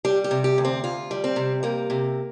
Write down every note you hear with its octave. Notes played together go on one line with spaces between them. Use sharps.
G3 G4
G4
C3
G4
D2
C4
D2 F4
G3
C4
C3
G3 A#3
C3